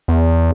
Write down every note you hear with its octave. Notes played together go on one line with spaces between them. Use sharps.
E2